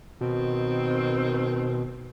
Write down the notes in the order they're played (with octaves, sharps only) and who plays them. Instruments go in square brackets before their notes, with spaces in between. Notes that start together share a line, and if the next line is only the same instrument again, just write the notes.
[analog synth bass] B2 [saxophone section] D#3 C4